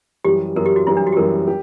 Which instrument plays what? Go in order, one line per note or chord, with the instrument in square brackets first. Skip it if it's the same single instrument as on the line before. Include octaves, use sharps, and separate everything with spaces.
[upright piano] F#2 E3 G3 [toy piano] G4
[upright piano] F#2 E3 G3 [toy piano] A#4
[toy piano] G4
F#4
[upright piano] F#2 E3 G3 [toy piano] E4
[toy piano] D4
F#4
G4
[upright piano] F#2 E3 G3 [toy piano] A#4
[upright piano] G4